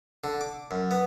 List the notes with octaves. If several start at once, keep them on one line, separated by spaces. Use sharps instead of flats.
D3
D6
F#2
B3